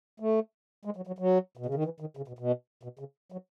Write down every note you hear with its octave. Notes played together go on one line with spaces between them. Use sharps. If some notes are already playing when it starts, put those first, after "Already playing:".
A3
G#3
F#3
F#3
F#3
B2
C#3
D#3
E3
D#3
C#3
B2
B2
B2
C#3
F#3